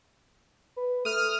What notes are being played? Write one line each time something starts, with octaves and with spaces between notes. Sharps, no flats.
B4
A3 D#6 F6